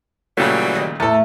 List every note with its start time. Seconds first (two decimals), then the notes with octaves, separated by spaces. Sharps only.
0.38 A#2 C#3 E3 F#3 G3 A3
0.75 D#3 D#5
1.00 E2 A2 E3 A3 A4